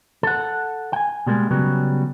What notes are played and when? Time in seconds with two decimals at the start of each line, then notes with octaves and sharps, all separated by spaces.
0.23 A4 F#5
0.93 G5 G#5
1.26 B2 G3 G#3 A#3
1.51 C#3 F#3 G3 B3